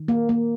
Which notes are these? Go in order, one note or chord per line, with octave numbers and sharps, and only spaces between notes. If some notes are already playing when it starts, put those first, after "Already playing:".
Already playing: D#3
A#3
A#3